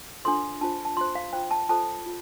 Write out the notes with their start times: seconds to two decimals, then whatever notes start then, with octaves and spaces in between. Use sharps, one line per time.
0.24 D4 F4 A4 C5 C6
0.61 D4 F4 C5 A5
0.85 A5
0.97 F4 C5 C6
1.15 F5
1.33 F4 C5 G5
1.51 A5
1.69 F4 A4 C5 A5
2.06 F4